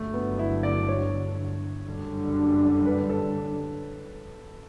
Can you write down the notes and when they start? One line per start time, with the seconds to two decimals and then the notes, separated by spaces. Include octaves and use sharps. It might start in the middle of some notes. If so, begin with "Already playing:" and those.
Already playing: G1 G2 D3 F#3 A3
0.14 B3
0.39 E4
0.63 D5
0.89 C#5
1.86 F#1 F#2 D3 G3
2.86 B4
3.09 A4